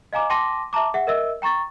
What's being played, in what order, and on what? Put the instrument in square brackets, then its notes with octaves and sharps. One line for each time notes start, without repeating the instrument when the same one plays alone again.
[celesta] D#5 F5 G#5 A#5 D6
G5 A5 C6 D6 A#6 D#7
E5 A5 A#5 D6
G#4 E5 F#5
A#4 D#5 E5 E6
G5 A#5 C#6 A6